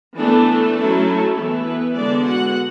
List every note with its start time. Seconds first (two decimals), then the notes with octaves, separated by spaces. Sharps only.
0.17 E3 A3 B3 D4 A4
0.76 F#3 C#4 E4
1.35 E3 A3 B3 E4 A4
1.66 B3 B4
1.95 D3 G#3 B3 D4 D5
2.25 F#4 F#5